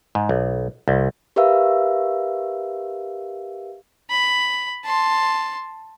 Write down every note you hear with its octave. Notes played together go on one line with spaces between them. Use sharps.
G#2
B1
C2
G4 A#4 B4 E5 F5 E6
B5
A5 C6